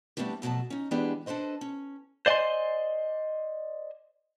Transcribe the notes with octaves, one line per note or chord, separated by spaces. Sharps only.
G3 A3 B3 C4 D4 G4
F2 B2 F#3 A3 A5
C#4 D#4
E3 G#3 B3 D4 G4 G#4
D4 A4 B4 C5 D#5
C#4
C5 D5 D#5 F#5 G#5 C6